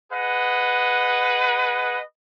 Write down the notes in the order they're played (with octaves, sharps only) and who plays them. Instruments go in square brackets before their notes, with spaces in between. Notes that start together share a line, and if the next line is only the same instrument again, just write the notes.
[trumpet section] G#4 B4 D#5 F#5